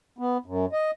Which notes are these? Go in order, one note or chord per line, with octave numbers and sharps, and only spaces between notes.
B3
F#2
D#5